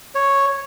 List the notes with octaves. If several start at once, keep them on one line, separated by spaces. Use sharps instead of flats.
C#5